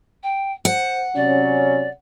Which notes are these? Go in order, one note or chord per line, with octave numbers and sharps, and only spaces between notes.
G5
C5 F#5
C3 F#3 C#4 D5